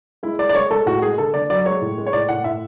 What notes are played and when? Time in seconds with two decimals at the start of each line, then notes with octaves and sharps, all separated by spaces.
0.23 G#3 E4
0.38 G#3 D5
0.49 D5
0.55 G#3 C#5
0.71 G#3 A4
0.86 A2 F#4
1.02 G#3 G#4
1.18 D3 A4
1.34 D3 D5
1.50 F#3 D5
1.66 G#3 C#5
1.81 A2
1.98 G#3
2.06 C#5
2.13 A2 D5
2.29 A2 F#5
2.44 A2 E5